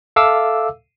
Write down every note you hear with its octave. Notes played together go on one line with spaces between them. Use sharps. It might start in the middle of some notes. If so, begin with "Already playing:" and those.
A4 E5 F5 D6 E6